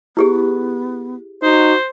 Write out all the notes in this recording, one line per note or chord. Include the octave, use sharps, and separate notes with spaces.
B3 E4 G4 G#4
D#4 F#4 C5